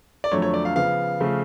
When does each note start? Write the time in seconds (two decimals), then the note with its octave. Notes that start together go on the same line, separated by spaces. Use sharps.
0.24 D5
0.32 F2 D3 F#3 A3 C#5
0.42 C#5
0.54 D5
0.65 F5
0.76 C#3 F3 B3 F5
1.20 C#3 F3 A3